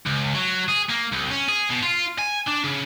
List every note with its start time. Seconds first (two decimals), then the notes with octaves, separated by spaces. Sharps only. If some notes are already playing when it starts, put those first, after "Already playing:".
0.06 C#2
0.35 F#3
0.69 G#4
0.89 A#3
1.12 C2
1.31 C#4
1.49 G#4
1.70 B2
1.83 F4
2.18 G#5
2.47 D4
2.64 C#3